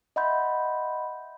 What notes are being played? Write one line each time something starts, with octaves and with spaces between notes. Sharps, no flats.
D#5 E5 F#5 B5 C6 G6